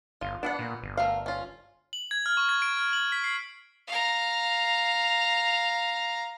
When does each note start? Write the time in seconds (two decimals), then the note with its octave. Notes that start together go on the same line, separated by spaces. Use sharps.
0.21 G1 F4
0.43 B3 D4 E5 F#5
0.59 A#2
0.83 G1
0.97 A3 A#4 F5
1.26 C#4 F4
1.93 F#7
2.11 G#6
2.26 F6
2.37 C#6
2.49 G#6
2.62 D7
2.77 F6
2.93 F#7
3.12 B6
3.24 C7
3.88 F5 A#5